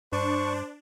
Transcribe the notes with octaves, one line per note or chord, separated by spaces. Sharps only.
G2 D4 C5 C#6